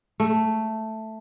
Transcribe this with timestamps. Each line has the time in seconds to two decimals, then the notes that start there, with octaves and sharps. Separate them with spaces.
0.20 A3